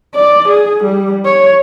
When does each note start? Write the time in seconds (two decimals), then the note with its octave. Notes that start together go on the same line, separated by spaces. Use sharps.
0.15 D5
0.48 G#4
0.84 G3
1.25 C#5